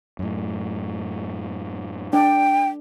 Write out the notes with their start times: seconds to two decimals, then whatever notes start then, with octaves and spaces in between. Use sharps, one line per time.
0.19 F#2 A2
2.13 D4 D5 G5